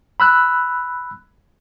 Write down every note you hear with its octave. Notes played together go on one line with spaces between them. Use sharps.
B5 E6 F#6